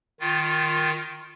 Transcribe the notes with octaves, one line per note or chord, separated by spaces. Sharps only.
D#3 F4